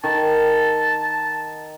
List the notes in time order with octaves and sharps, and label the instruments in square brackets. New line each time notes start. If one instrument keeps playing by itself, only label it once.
[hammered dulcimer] D#3 [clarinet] A5